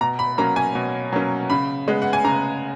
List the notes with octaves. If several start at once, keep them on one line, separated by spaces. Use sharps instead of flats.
B2 A#5
B5
F#3 A#3 C#4 A#5
G#5
B2
F#3 A#3 C#4
C#3 B5
G#3 B3
F#5
G#5
C#3 A#5